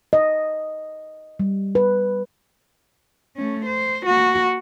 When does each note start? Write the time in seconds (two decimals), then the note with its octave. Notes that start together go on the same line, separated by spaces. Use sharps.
0.13 D#5
1.40 G3
1.75 B4
3.36 A3 C#4
3.66 C5
4.06 A#3 F#4